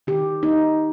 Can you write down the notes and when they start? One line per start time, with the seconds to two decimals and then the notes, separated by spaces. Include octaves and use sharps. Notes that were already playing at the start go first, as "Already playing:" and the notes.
0.07 D#3 G4
0.43 A#3 D#4